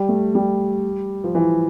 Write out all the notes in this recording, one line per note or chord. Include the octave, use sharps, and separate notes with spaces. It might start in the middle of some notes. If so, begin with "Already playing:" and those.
Already playing: G3
A3
G3
F3
E3